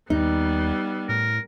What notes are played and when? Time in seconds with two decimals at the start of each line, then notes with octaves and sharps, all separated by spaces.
0.10 D#2 G3 B3 D#4
1.09 A2 A#4